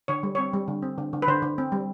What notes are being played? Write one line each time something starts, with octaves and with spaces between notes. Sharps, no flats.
D3 C#5
G3
C4 C#5
G3
D3
C4
D3
D3
B4
D3 C5
D3
C4
G3